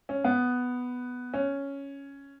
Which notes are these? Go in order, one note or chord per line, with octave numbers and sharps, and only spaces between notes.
C#4
B3
C#4